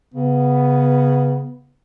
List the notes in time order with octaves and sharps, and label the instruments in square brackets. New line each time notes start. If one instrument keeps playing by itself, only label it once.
[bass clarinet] C#3 [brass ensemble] B3